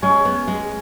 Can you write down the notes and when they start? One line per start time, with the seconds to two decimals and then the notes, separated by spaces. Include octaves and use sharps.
0.02 G#3 C#4
0.25 B3
0.47 G#3